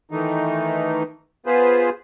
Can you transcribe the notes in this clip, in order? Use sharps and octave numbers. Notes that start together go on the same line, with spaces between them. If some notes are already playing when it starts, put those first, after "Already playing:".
D#3 E3 A3 D#4
B3 F4 G#4 B4 C5